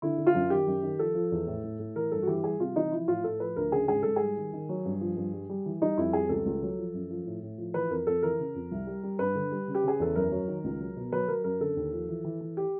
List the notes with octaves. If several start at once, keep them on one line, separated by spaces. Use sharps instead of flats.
D3 E4
D3
F4
F#2
D#3 G4
F#2
D#3
F3 A4
F3
E2
A2
A2
A2
E3 A#4
G2 A4
F#4
E3 G4
G3 G#4
C3 F4
E3 D#4
F3 E4
A2 F4
A2 A4
F3 B4
D2 A#4
C#3 G#4
G#2 G#4
G#2 A4
G3 G#4
D#3
D#3
F#3
G2
F3
G2
G3
G3
E3
G3 D#4
F2 E4
G3 G#4
C#2 A4
C#2
F#3
F3
F#2
F3
A2
A2
F3
E3 B4
F2 A#4
F2 A4
E3 A#4
C#3
F2
C2
G3
G3
G2 B4
D3
G3
C#3
G4
C#3 G#4
E2 A4
F#2 A#4
F#3
D#3
C#2
F#3
B2
F#3 B4
F#3 A#4
F#2 A#4
D3 A4
D#2
F3
E3
E3
E3
G4